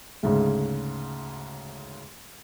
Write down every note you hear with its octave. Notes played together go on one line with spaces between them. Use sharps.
D2 G#2 C#3